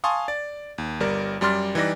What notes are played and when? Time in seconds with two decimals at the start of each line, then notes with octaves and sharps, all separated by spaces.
0.04 F5 G#5 A5 C6 C#6 D#6
0.28 D5 A6
0.78 D#2
1.00 G1 G3 A#4 D5
1.41 F#2 G3 D5 C6 F6 A6
1.75 E3 G3 D#4 B4 D5 A#6